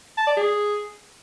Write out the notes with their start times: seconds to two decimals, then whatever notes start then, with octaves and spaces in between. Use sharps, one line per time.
0.17 A5
0.27 D5
0.37 G#4